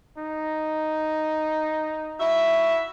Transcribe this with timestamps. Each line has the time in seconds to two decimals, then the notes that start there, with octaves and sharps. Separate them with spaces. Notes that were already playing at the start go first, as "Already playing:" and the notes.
0.17 D#4
2.20 E4 F#4 E5